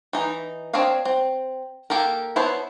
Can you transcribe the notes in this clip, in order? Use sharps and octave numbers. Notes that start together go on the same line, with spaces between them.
E3 D#4
C4 D4 C#5 D#5 F5
C4
A#3 G4 A4 A#4
B3 E4 C5 C#5 A5